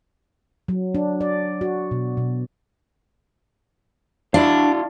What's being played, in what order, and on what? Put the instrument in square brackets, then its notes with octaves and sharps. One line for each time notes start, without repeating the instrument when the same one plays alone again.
[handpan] F#3
D4
D5
F#4
B2
B2
[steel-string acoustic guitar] D4 [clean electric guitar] E4 F#4 F5